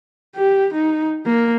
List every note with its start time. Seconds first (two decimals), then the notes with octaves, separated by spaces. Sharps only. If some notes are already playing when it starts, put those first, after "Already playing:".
0.35 G4
0.73 D#4
1.26 A#3